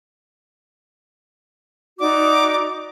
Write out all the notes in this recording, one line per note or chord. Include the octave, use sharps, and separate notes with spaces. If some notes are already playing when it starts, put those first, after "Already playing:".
D#4 F#4 D5 D6